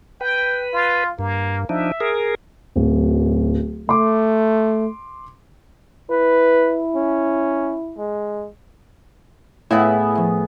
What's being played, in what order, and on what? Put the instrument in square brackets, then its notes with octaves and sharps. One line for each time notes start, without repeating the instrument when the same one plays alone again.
[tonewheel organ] B4 [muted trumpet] G5
[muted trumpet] F4
[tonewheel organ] G2 [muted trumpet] A#3
[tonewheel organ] F3 D4 D#4 [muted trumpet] E5
[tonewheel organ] G#4 A#4
[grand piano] D1 [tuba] F#2
[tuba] A3 [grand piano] C6 D6
[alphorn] E4 [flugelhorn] B4
[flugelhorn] C#4
G#3
[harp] A2 [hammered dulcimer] B3 G#4 [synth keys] E4 [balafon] C#5 F5 G5
[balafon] F3 E5